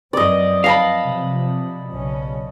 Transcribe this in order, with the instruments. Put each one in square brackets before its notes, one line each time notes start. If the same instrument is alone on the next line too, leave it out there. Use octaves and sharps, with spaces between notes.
[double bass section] F#2 F3 C4 [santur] D5 D#5
[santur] D#5 A5 B5 [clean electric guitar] F5
[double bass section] C3 F3
B1 C#3 C#4